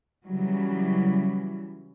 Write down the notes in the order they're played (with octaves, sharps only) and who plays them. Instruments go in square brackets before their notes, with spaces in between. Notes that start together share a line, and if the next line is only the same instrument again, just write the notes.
[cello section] C#3 E3 F#3 G3